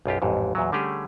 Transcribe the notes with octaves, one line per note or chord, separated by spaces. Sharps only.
B1 F#2 F4 G4
A1 F2 G#2
E2 A#2 F#3
D3 G3 A3 C#4 G4 G#4